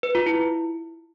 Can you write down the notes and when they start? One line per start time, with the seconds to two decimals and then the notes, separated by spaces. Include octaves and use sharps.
0.03 B4
0.15 F4
0.26 E4